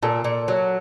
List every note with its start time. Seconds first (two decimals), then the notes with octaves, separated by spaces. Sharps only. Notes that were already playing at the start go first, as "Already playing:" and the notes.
0.03 A#2 A4
0.24 A#2
0.48 F#3